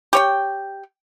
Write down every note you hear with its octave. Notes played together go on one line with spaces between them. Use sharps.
G4 C#5 G5